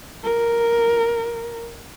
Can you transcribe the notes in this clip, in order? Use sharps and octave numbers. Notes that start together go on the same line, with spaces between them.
A#4